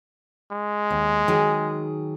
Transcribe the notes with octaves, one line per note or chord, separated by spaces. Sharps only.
G#3
D#2
D#3 F#3 G#4